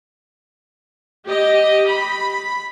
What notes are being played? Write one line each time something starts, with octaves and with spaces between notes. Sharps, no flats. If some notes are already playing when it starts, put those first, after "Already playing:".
G4 D#5
B5